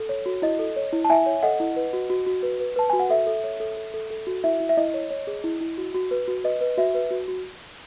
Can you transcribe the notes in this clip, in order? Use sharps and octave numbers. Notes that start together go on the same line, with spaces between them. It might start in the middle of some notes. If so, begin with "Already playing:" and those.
Already playing: A4
C#5
F#4
E4 D#5
A4
C#5
E4
A5
E4 E5 G#5
C#5
A4 D#5 F#5
E4
B4
F#4
F#4
F#4
B4
B4
B4 A5
F#4 G#5
F#5
A4 E5
A4
C#5
A4
A4
A4
A4
F#4
E4 E5
E4
E5
E4 D#5
C#5
C#5
G#4
E4
E4
F#4
F#4
B4
F#4
B4 D#5
B4
F#4 E5
B4
F#4
F#4